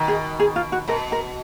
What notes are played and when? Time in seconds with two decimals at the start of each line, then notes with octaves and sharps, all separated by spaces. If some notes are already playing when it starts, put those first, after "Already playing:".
Already playing: B2 D#3
0.08 G#4
0.40 G#4
0.56 F4
0.72 F#4
0.88 B2 A#4
1.12 A#4